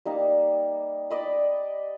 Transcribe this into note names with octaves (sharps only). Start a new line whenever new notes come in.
G3 A#3 D#4
D5 D#5 B5